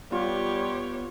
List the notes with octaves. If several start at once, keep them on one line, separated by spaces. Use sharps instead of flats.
G3 B3 F4 G4 C#5